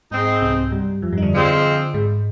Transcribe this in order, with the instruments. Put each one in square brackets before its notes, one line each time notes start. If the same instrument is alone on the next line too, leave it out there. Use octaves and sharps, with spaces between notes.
[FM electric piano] G#2 [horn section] G#3 C4 D#4
[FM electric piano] C2 C3
G2 G3
F2 F3
G2 G3
D#4
D3 D4
[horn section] F3 G#3 C4
[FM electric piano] G#2 G#3